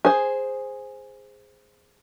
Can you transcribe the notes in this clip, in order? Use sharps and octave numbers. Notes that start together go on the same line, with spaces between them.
G#4 C5